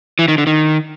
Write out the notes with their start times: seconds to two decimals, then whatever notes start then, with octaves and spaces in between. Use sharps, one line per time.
0.19 E3
0.28 D#3
0.38 D3
0.47 D#3